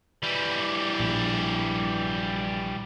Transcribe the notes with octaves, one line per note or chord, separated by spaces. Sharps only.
E3 G3
A#1